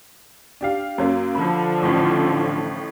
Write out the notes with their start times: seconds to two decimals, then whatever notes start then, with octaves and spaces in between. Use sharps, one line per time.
0.61 D4 G4 F5
0.98 F#2 F#3 A#3
1.35 D3 F3 B5
1.82 A1 A2